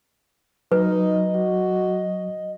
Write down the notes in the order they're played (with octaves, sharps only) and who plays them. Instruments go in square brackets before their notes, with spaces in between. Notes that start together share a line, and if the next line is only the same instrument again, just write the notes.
[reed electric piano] F#3 [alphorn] D#4 [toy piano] B4 [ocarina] D#5
[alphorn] F#4